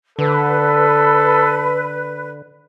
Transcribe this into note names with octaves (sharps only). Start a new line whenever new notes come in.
D3 A4 B4